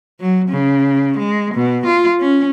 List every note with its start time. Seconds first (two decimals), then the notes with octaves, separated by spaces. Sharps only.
0.20 F#3
0.49 C#3
1.18 G#3
1.54 B2
1.86 F4
2.20 C#4